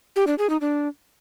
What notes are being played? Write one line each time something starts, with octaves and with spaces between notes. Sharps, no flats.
G4
D4
G#4
D#4
D4